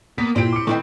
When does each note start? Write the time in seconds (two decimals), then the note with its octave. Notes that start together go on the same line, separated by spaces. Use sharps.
0.18 A#3 B3 B6
0.36 A#2 C4 E4 G4 C6 D7
0.52 D6 C#7
0.67 D#3 E3 A3 C4 E4 D#5